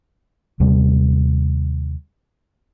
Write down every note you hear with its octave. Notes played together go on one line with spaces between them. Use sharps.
D#2 C3 G3